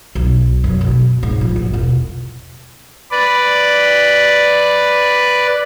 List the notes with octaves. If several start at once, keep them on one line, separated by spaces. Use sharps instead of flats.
B1
F#2
B2
G#2
A#1
A#1
E1
B4 D5